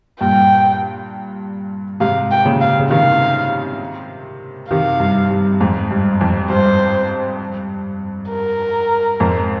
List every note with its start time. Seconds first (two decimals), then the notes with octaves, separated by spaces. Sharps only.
0.20 G2 A#2 G5
2.00 G#2 C3 F5
2.31 G5
2.45 A#2 C#3
2.61 F5
2.79 C#3
2.90 C3 D#3 F5
4.70 C3 D#3 F5
5.00 G2
5.31 G2
5.60 F2 G#2
5.91 G2
6.21 F2
6.50 G2 C5
8.30 A#4
9.20 F2 G#2